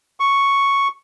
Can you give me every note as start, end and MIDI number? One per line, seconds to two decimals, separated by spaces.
0.20 0.88 85